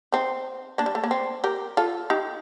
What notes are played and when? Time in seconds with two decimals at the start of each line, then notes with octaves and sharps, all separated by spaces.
0.12 C4 D#4
0.78 A#3 D4
0.86 G3
0.95 A3
1.04 A#3
1.11 C4
1.44 G4 A#4
1.77 F4 A4
2.10 D#4 G4